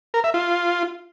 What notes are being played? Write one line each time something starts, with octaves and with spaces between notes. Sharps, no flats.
A#4
E5
F4